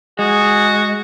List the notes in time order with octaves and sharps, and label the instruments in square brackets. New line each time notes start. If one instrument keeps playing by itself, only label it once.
[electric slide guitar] G#3 [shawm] F#4 [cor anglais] G#4